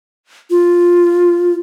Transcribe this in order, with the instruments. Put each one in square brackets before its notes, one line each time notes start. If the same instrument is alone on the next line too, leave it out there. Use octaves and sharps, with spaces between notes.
[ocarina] F4